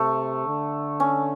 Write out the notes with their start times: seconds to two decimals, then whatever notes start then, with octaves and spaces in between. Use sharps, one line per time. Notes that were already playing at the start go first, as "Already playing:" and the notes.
Already playing: C3 A3
0.47 D3
1.00 C#4